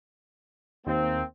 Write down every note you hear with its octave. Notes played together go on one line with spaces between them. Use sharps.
D#2 A#3 C4